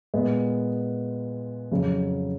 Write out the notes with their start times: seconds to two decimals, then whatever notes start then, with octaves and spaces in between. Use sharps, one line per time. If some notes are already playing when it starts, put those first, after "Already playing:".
0.14 A#2 G#3 B3
1.72 F2 C#3 F#3